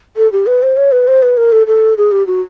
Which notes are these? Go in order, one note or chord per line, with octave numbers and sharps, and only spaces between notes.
A4
G4
B4
C5
C#5
B4
C5
B4
A#4
A4
A4
G#4
G4
F#4